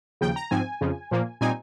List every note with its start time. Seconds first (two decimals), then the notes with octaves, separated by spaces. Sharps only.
0.21 D#2 C#3 F3 G5
0.36 A#5
0.51 G#2 F3 C4 G#5
0.81 F2 C#3 F3
1.11 A#2 F3 A#3
1.41 A#2 G3 C4 D#4 G#5